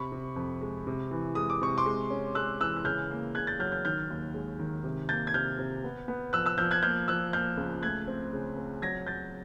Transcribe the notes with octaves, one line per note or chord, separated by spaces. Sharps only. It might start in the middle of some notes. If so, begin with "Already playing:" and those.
Already playing: C3 B5 C#6
C3
F2
G#3
C3
E3
G#3 D#6
D6
C3 C#6
C6 D6
G#3
C#4
G#3 E6 F#6
E3 E6 F#6
F#6
C#3 F6 G6
A#3
C#3 F#6 G#6
G6 A6
F#3 F6 G6
F6 G6
D#3 F6 G6
D#2
G#3
D#3
C3
A#3 G6 A6
G#6
C3 F6 G6
C3
B3
B3
F3 E6 F#6
E6 F#6
F3 F6 G6
F#6 G#6
A#3 F6 G6
F3 E6 F#6
A#3 F6 G6
C#2
A3 F#6 G#6
C4
C#3
C4
F#3 G#6 A#6
F#3 G6 A6